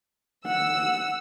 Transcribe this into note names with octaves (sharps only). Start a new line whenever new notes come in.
F#5 E6